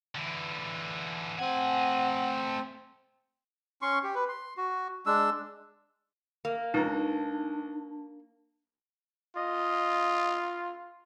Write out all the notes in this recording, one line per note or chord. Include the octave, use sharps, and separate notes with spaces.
D3 E3
A3 C4 F#5 G#5
C#4 C6 C#6
G4
B4
C6
F#4
G#3 D4 E6
A#3
C#2 D4 D#4 A#5
F4 D#5